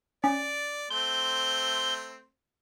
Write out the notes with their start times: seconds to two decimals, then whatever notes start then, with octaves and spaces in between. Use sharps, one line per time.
0.24 C#4 D5
0.91 A3 C4 C6 G6